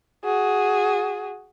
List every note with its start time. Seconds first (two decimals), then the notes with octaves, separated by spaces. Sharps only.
0.25 F#4 G#4